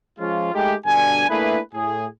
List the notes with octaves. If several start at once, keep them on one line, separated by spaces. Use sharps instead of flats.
F3 G#3 C#4 F4
G#3 A3 D#4 G4
G2 B2 D3 D4 G#5
A3 A#3 D4 E4 G#4 B4
A2 G#4